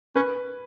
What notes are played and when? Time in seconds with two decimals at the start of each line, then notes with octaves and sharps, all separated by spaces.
0.16 C#4 B4